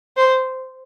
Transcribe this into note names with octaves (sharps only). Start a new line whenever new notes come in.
C5